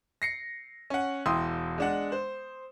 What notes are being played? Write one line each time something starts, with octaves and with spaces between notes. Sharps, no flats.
A#6 C7 C#7
C#4 F#5
E1 E4 G5 C6 D#6 E6
G#3 D4 F#5
C5